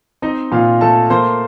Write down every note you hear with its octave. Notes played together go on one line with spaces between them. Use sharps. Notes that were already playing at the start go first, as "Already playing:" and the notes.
C4 D#4 D#5
A#2 F4 F5
A3 A4 A5
A#3 C5 C6